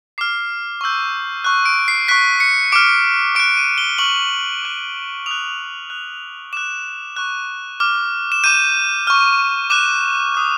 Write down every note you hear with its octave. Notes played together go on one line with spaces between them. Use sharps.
D6 F6 C7
C#6 E6 G6
C#6 F#6
D7
C7
C#6 F#6 B6
C#7
D6 F6 D7
D6 F#6 D7
D#7
G7
C#6 F6 F#7
D6 F#6
D#6 F#6 F7
D#6 F#6
D6 F#6 E7
C#6 F#6
D6 F6
E7
D6 G6 D#7
C#6 F6
D6 F#6 E7
D#6 F#6